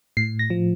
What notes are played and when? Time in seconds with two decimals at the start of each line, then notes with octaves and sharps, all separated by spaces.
0.17 A2 C7
0.39 A#6
0.50 F3